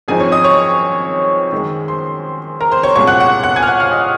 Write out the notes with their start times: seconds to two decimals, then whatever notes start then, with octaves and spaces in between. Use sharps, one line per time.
0.08 G#1 F#2 F3 C4 D#4 G#4 G#5
0.20 C#5 C#6
0.32 D#5 D#6
0.44 C#5 C#6
1.52 F#2 D#3 G#3
1.88 C5 C6
2.61 A#4 A#5
2.72 C5 C6
2.83 C#5 C#6
2.95 C2 A#2 G#3 C#5 C#6
3.07 F#5 F#6
3.20 F#5 F#6
3.43 F#5 F#6
3.56 G#5 G#6
3.63 F6
3.68 F#5 F#6
3.80 F5 F6
3.92 D#5 D#6